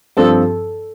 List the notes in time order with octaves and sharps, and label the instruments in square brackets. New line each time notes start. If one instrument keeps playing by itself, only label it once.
[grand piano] G2 F3 C4 [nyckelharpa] A4